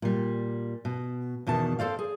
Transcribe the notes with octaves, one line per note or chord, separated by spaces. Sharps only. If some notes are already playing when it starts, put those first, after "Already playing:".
A#2 G3
B2
E2 B2 D#3 A5
A4 C5 D5 F5
G#4